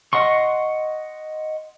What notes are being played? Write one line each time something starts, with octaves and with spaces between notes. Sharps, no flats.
D#5 F#5 C6 C#6